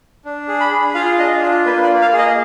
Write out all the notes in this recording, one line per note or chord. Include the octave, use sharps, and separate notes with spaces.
D4
G#4
B5
G#4
F4 F5
D4 D#5
F4
A#3 B4
D5
A#3
F5
G#4
D#5